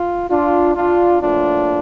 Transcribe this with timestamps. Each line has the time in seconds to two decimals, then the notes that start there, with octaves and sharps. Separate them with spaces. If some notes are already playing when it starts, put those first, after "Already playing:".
Already playing: F4
0.30 D4 F4
0.75 D4 F4
1.21 A2 F3 A#3 D4 F4